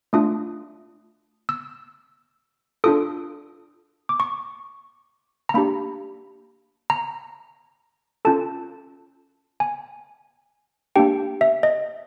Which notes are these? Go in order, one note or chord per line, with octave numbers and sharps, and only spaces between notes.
A3 D4 F4 D#6
E6
D4 F4 A4 D#6
D6
C#6
A#5
A#3 D4 G4 B5
A#5
C#4 F4 A4 A5
G#5
A#3 D4 G4 G5
E5
D#5